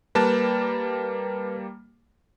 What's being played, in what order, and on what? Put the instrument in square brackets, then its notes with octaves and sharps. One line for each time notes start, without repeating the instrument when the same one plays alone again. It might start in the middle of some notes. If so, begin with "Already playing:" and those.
[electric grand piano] G3 A#3 A5 [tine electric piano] B4